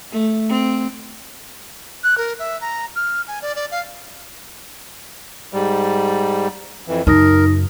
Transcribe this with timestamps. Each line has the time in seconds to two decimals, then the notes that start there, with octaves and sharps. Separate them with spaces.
0.12 A3
0.49 C4
2.04 F#6
2.18 A#4
2.39 E5
2.61 A#5
2.96 F6
3.28 G#5
3.42 D5
3.56 D5
3.71 F5
5.53 G#2 G3
6.88 F2 E3
7.07 F#2 C#3 D#4 A#4 D#6 A#6